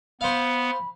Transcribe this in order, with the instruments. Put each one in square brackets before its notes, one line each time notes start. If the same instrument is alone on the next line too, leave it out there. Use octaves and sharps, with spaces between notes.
[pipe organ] B3 [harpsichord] C5 F5 [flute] B5